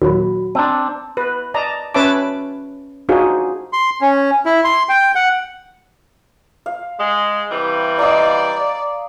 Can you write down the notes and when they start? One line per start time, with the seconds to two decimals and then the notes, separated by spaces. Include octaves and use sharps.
0.02 D#2 A#2 F#3 F#4 B5
0.55 C4 D4 A5 A#5 C6
1.17 B4
1.54 D5 D#5 A5 A#5
1.94 C#4 B4 C#5 E5 A5 D6
3.09 D4 D#4 F4 F#4 G#4 C5
3.73 C6
4.01 C#4
4.45 E4
4.64 C6
4.89 G5
5.15 F#5
6.66 F5
6.99 G#3
7.50 C3 E3 G3
7.99 D5 D#5 F5 A#5